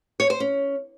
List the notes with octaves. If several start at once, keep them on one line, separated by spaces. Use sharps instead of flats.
C#5
C5
C#4